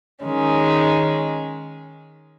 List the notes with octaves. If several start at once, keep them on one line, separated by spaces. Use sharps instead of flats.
D#3 G#3 C#4